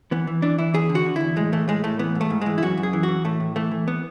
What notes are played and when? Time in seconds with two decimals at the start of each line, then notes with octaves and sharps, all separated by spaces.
0.11 E3 B3
0.27 E3
0.42 E3 D4
0.59 E3 E4
0.74 E2 G#4
0.89 D3
0.95 F#4
1.06 D3
1.16 E2 E4
1.36 A2 G#3
1.52 E3 A3
1.68 A2 G#3
1.84 A2 A3
1.99 E3 B3
2.15 G#2
2.21 A3
2.30 G#2
2.42 E3 G#3
2.58 E4
2.63 F#2 F#4
2.77 F#2
2.83 G#4
2.93 E3
3.03 F#4
3.08 E3
3.25 A2 A3
3.40 A2
3.56 E3 A3
3.71 E3
3.88 B3